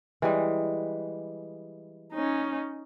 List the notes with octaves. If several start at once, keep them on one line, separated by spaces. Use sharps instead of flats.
E3 G3 G#3
C#4 D#4